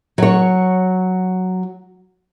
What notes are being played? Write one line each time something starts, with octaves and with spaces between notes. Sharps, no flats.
F#3 C#5